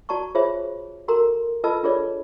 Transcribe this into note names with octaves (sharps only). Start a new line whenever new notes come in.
F#4 D5 A5 A#5 C#6
F4 G#4 C5 C#5 E5
F#4 A4 A#4 A#5 C6
F4 A4 B4 D#5 A5 E6
D4 F4 G#4 A4 C#5 D5